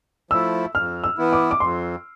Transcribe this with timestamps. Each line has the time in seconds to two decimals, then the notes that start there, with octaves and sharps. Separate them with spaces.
0.31 F3 A3 E4 E6
0.75 F2 F6
1.04 E6
1.18 E3 B3 E4
1.33 D6
1.51 D6
1.60 F2 C6